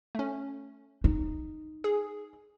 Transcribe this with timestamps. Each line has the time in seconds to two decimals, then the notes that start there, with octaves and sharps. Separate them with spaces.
0.15 A3 C#4
1.04 D#4
1.84 G#4